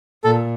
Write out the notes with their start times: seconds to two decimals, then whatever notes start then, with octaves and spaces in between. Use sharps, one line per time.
0.24 A#2 A4